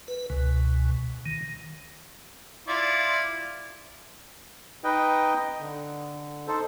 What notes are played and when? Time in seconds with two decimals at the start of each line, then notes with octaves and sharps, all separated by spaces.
0.08 B4
0.30 C#2 B2
1.26 D#3
2.68 E4 F4 D5
4.84 D#4 B4 D#5 G5
5.59 D3
6.47 D#4 A4 C5